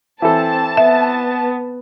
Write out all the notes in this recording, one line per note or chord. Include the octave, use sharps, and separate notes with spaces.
E3 C4 A4 A5
B3 E5